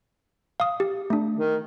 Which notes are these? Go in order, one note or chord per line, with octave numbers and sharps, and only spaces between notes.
F5 D#6
G4
A3 D4
D#3